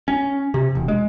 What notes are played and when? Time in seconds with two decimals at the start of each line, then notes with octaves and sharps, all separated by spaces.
0.08 C#4
0.54 C3
0.75 E1
0.88 G#3